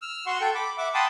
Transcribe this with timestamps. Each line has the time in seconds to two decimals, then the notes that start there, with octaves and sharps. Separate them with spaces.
0.02 E6 F6
0.26 F#4 F#5 C6 C#6
0.41 A4 G5
0.55 B5 D6
0.78 E5 F#5 D6
0.94 F#5 G5 A5 B5 C6 D#6